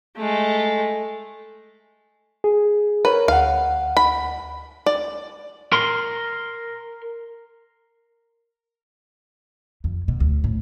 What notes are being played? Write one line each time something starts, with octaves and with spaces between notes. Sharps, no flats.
G#3 A3
G#4
A#4 B4 C#5
D2 F5 F#5
B5
D5
A#4 C6
F2
B2
D2
A2